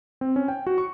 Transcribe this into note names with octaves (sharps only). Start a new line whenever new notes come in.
C4
C#4
G5
F#4
C#6